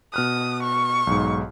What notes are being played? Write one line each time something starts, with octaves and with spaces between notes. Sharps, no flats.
B2 D#6 F6 F#6
C#6
B1 G#2